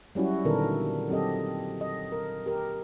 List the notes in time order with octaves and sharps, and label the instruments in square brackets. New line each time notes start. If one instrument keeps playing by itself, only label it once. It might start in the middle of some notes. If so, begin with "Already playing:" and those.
[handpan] F#3 G3 C#4 E4 F#4
A#2 D3 D#3 B3 A4 A#4
F#3 C4 G4 A4 D#5
D#5
A#4
G4 A#4